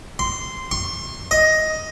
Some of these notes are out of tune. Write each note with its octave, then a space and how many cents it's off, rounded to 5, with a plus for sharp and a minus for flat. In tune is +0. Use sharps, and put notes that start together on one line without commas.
C6 -10
C6 +40
D#5 +10